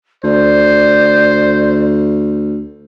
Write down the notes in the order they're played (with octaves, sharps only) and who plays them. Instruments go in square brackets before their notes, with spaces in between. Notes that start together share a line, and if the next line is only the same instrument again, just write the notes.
[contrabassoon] D2 [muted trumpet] C5 [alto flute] D5